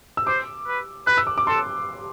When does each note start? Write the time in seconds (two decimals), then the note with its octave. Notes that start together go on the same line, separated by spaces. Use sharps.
0.17 E6
0.27 C5 D6
0.67 B4
1.07 B4 F#6
1.17 E6
1.27 D6
1.38 D6
1.47 A4 C6